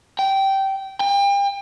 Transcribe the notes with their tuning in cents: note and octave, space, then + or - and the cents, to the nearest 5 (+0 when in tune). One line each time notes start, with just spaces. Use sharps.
G5 -15
G5 +35